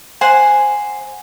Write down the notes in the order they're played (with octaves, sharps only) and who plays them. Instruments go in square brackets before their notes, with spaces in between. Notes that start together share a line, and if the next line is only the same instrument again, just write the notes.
[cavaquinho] C5 F#5 G#5